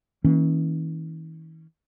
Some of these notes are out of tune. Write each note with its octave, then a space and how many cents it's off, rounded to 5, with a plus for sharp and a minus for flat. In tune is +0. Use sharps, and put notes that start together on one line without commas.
E3 -45 A#3 -10 C#4 -20